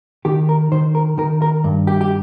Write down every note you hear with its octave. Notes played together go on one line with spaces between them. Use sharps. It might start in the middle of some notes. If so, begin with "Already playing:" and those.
D#3 G4
A#4
D#3 C5
A#4
D#3 A#4
A#4
G2
G4
G4